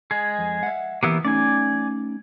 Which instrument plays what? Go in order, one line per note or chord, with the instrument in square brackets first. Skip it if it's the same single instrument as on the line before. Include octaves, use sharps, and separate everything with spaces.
[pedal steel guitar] G#3 G#4
[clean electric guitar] F2
E5 F#5
[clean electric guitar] E3 G4 [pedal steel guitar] A#3 B3 E4
[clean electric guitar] A3 C#4 D#4 [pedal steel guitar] D5 G#5